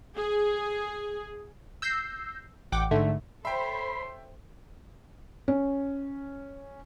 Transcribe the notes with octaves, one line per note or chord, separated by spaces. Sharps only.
G#4
E6 G6 A#6 C7
A1 F#5 G5 D6
G#2 D3 A3 E5
A4 C5 C#5 E5 G5 B5 C6
C#4